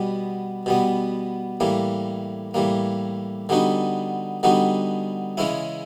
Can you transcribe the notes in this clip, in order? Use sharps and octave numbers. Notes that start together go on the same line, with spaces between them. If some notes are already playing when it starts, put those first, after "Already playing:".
Already playing: B2 G3 B3
B2 G3 B3
A2 E3 G3 A#3
A2 E3 G3 A#3
D3 G3 B3 D#4 F#4
D3 G3 B3 D#4 F#4
C#3 E3 G#3 C#4 E4